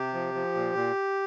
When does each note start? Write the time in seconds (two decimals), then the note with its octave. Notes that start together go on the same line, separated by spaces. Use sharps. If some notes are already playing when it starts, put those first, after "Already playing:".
Already playing: C3 G4
0.13 F3
0.34 F3
0.55 A#2
0.75 A#2